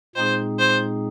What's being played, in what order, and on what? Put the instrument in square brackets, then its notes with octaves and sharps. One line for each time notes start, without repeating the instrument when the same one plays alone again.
[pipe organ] A#2 G#3 C4 D#4 G#4 [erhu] C5
[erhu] C5